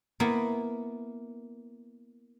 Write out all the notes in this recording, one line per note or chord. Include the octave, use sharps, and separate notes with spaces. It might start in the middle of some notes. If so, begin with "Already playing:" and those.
A#3 B3 E4